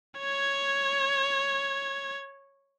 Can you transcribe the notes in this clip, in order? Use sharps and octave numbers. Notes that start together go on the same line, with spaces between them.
C#5 G#6